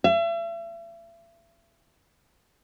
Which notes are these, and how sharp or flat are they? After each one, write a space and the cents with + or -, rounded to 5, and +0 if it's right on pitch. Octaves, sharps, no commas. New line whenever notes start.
E5 +40